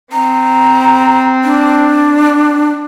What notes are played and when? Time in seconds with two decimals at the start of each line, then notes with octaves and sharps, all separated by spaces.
0.13 C4 A#5
1.44 D4